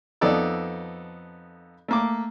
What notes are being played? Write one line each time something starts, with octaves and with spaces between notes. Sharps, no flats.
F2 B3 D#4 A4 D5 E6
A3 A#3 D6